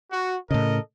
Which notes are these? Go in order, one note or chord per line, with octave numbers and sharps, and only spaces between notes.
F#4
A2 C#3 A4 A#4 D#5